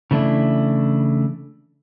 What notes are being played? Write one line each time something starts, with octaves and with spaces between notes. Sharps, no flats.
C#3 E3 A3 D4 E4